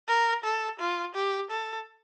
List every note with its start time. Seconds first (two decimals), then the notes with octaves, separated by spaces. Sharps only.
0.09 A#4
0.44 A4
0.80 F4
1.15 G4
1.50 A4